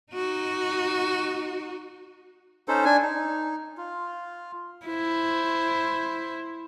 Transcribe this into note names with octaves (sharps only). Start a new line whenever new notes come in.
D#4 F#4
C#4 D#4 A4 C5
D4 G#5
D#4
F4
E4 C5